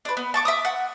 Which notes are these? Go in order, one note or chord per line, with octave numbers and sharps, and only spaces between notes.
D4 B4
B3
A5 C#6 D6
E5 D6 D#6
F#5